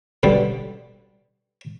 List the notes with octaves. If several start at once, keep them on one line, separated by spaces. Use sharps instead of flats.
B2 D3 G3